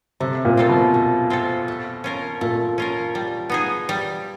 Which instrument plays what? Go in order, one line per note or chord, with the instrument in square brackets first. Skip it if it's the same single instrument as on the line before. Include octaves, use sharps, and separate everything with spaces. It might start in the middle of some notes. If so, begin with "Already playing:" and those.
[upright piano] C3 [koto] A3
[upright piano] A#2
[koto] C4 F4 A4
[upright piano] B2
[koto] A3
C4 F4 A4
A3
C#4 F4 A#4
[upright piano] A#2 [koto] A3
[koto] C#4 F4 A#4
G3
B3 D#4 G#4
G3